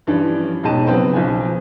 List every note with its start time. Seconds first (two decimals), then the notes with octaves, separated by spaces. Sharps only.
0.07 G2 E3 F3 C#4 D4
0.63 E1 G#2 B2 G5 A5 D#7
0.87 C#3 F#3 B3 C4 C5
1.14 B1 F3 G#5